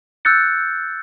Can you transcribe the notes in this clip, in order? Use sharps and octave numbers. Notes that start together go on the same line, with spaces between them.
E6 F#6 G6 A6 C#7